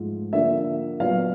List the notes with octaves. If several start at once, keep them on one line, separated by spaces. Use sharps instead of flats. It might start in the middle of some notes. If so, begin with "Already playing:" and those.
Already playing: G#2 F3 A3
D3 F3 A#3 E5
A#2 F#3 B3 F5